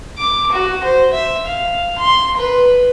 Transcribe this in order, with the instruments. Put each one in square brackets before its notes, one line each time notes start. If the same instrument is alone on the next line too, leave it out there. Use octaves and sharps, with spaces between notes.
[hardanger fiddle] D6
F#4
C5
E5
F5
C6
B4